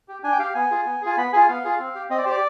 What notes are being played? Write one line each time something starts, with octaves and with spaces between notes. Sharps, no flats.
G4
D4 G#5
G5
G4 F5
B3 G#5
F4 G#4
B3
F4 G#4 G#5
B3 B5
F4 G#4 G#5
B3 F5
F4 G#4
C4
G4
C4 D#5
D5
G4 C5
D5